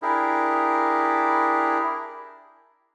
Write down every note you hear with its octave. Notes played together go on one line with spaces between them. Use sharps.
D4 E4 G4 G#4 A#4